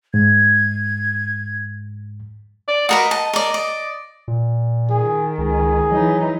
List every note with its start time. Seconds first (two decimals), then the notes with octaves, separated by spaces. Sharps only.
0.14 G#2 G#6
2.68 D5
2.89 F#4 A#4 B4 D#5
3.11 A5
3.33 A#4 D5
3.54 D5
4.28 A#2
4.90 D#3 G#4
5.38 C#2 G#4
5.92 E3 F#3 D#4